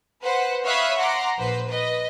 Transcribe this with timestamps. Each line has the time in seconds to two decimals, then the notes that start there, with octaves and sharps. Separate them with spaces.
0.22 B4 C5 F#5
0.64 C#5 E5 F5 B5 D#6 F#6
0.97 F#5 A#5 C6 D6
1.38 A#1 B4 C5
1.68 B4 D#5